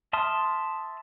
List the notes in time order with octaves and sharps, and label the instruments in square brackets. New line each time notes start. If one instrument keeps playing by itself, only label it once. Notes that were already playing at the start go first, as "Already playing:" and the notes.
[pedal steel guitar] E5 A5 C6 D#6 F6